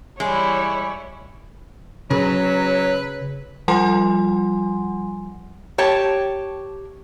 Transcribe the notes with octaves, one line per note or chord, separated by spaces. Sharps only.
E3 G3 G#3 E4 C#5 B5
C#3 F#3 B4
F3 G3 F4 F#5 G#5 C6
G4 C#5 A5